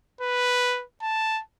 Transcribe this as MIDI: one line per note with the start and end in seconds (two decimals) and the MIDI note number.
0.21 0.83 71
1.02 1.41 81